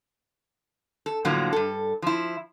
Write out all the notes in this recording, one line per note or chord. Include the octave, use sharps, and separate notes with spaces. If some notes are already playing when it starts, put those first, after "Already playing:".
A4
A2 D3 F3 F#3 A#3
G2 A4
F3 E4